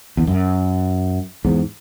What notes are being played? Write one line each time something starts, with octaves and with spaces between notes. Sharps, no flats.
E2
F#2
E2 G#2